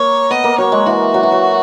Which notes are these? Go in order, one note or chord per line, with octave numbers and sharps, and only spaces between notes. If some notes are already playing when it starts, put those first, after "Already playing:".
Already playing: A#3 C#5
B3 D#5
A#3
F#3 C#5
G#3
E3 F#4
F#3
E3
F#3